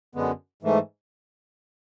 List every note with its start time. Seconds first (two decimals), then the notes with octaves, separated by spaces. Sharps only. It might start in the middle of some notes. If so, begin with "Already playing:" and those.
0.15 F#2 D3 G#3 B3
0.62 G#2 E3 A3